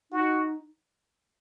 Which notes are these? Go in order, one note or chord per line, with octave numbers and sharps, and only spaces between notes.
D#4 F#4